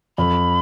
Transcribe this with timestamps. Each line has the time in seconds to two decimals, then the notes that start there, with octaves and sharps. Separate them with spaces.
0.18 F2 B5